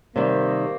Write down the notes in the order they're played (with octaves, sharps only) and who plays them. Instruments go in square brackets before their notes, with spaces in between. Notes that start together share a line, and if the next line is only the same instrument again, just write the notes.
[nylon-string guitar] C3 D#3 G3 [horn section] A#3